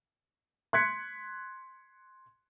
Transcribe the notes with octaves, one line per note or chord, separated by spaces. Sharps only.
C6 F#6 G#6 B6 C#7